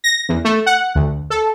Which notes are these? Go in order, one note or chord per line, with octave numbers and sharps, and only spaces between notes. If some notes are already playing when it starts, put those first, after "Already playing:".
A#6
E2
A3
F#5
D2
A4